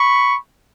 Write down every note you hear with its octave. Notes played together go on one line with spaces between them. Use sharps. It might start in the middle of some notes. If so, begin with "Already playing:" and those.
Already playing: B5 C#6